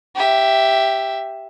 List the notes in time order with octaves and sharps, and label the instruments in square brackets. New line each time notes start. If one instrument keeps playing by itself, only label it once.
[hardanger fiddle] G4 E5